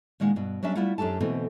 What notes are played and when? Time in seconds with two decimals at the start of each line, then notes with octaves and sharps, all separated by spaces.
0.20 A#2 D#3 G#3 F#5
0.36 G2 B2
0.63 F#3 G3 C#4 D4 E5
0.75 G3 A3 B3 E4 F4 F#5
0.98 F#2 D4 G4 A4 A5
1.20 B2 D3 E3 A3 C4